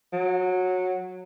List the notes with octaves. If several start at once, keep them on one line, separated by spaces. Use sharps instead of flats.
F#3